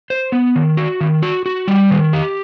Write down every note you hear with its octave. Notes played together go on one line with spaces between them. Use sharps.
C5
B3
D#3
F#4
D#3
F#4
F#4
G3
D#3
G4